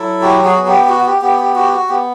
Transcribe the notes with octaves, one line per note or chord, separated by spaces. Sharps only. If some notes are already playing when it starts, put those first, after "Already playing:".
Already playing: F#3 E4 A4
F#4 G4
F#4 G#4
B3
G4
G4
F#4
F#4
G4
B3 G4
G4
F#4 G4
F#4
B3 G4